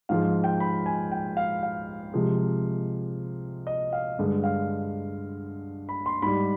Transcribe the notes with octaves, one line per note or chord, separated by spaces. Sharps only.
G#2 F3 G#3 F5
G5
B5
G#5
G5
F5
F5
C3 F3 G#3
D#5
F5
G2 D3 G#3
F5
B5
C6
G#2 G3 B5